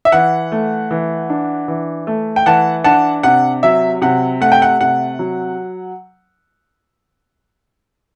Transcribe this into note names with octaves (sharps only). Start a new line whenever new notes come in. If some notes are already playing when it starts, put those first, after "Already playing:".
E5
E3 F#5
A3
E3
D4
E3
A3
G5
E3 F#5 A5
D4 F#5 A5
C3 F#5
F#3 E5
C3 F#5
A3 F#5
G5
F#5
C3 F#5
F#3